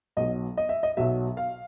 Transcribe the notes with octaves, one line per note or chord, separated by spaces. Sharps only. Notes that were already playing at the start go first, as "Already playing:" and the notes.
B1 B2 F#3 D#5
D#5
E5
D#5
B1 B2 F#3 E5
F5